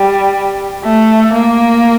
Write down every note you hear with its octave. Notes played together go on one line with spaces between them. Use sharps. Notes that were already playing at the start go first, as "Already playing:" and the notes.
Already playing: G3
A3
A#3